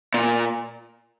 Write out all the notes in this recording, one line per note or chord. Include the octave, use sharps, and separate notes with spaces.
A#2